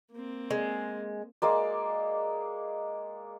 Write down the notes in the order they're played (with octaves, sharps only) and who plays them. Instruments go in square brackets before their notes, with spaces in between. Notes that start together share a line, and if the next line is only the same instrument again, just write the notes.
[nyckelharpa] A#3 C4
[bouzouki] G#3
[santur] G#3 A#3 D5